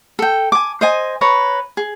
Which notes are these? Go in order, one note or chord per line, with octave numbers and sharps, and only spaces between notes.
A4 G5
G#5 D6
C5 D#5 G#5
B4 C#5 A#5
G#4